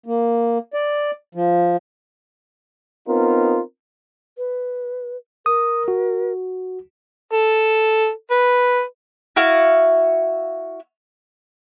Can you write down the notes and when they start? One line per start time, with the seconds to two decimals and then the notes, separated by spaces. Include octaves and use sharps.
0.06 A#3
0.74 D5
1.35 F3
3.08 B3 C4 D#4 F4 A#4
4.38 B4
5.46 A#4 D#6
5.88 F#4
7.33 A4
8.31 B4
9.36 E4 F#4 F5